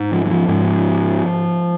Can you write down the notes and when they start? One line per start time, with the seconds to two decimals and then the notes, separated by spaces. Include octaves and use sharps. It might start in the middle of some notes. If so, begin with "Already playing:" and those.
Already playing: G#2
0.12 F3
0.26 F#3
0.30 F3
0.48 G#2